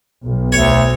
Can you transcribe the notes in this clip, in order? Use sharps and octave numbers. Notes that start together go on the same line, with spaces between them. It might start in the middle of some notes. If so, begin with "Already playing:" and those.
B1
D2 C#5